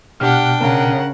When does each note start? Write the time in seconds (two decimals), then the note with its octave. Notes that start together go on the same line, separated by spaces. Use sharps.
0.20 B2 D4 G4 F#5 G5 F6
0.60 C#3 A#4 F#5